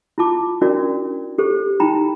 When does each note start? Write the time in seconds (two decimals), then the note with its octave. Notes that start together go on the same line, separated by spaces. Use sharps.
0.18 E4 F4 A5 D6
0.61 C#4 D4 E4 F#4 A#4 D5
1.38 G4 A4 C5
1.80 D#4 E4 G5 A#5 B5